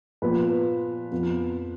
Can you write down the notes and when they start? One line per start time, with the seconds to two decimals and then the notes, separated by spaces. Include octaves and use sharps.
0.22 A#2 F3 B3 B4
1.11 F2 F3 B3